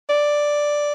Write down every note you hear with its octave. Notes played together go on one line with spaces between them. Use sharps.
D5